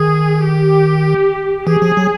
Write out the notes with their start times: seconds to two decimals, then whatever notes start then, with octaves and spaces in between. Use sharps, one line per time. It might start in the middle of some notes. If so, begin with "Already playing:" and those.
Already playing: D#3 G#4
0.48 G4
1.67 E3 G#4
1.82 F3
1.97 F#3